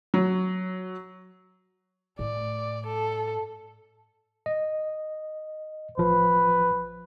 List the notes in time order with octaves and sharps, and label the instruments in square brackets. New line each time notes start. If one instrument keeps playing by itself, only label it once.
[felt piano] F#3
[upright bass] A2 [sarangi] D5
[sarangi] A4
[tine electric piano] D#5
[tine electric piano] A1 F3 [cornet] B4